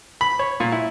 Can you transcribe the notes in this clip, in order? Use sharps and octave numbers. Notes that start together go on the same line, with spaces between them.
B5
C#5
A#2
E4